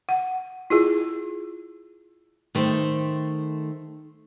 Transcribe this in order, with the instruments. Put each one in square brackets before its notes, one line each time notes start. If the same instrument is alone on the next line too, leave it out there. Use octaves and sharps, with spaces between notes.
[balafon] F#5
E4 F4 G#4
[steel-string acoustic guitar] D#3 A3 C5